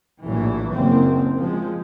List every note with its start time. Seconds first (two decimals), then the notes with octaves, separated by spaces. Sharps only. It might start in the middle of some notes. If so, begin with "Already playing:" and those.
0.24 A#1 A2 E3 F#3
0.73 F#1 F#2 A#3 C4
1.36 F3 G#3